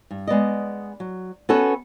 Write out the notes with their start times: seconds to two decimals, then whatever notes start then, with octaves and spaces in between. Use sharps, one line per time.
0.11 G2
0.27 G#3 B3 D5 D#5
1.00 F#3
1.49 B3 C#4 F#4 A4 B4 C#5